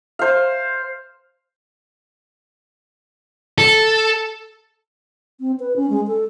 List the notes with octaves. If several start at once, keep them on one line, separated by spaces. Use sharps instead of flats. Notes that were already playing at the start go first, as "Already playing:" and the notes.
C5 F5
A4
C4
B4
C#4
G#3
A4